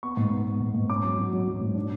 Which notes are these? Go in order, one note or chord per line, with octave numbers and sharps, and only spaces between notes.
B3 C#6
G#2
B3
B3
G#2
G#2
C#4 D6
F#3
F#3
F#3
F#3
G#2
D4